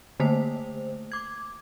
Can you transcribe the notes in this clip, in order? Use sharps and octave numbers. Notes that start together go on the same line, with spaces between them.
D3 A3 A#3 C5
D6 G#6